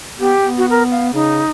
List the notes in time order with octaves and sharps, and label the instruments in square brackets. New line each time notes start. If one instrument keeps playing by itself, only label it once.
[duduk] B3 [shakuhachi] G4
[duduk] B3
[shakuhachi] F#4
A#4
F5
[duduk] C#3 [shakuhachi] D#4